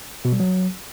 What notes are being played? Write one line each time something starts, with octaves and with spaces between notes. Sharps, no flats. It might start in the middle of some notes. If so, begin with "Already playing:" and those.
B2
G3
F#3